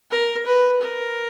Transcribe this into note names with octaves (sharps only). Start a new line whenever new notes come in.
A#4
B4
A#4